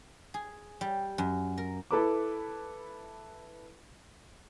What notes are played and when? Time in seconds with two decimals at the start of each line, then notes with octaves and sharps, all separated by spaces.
0.34 G#4
0.81 G3
1.18 F#2
1.58 A#4
1.91 E4 A4 B4 D6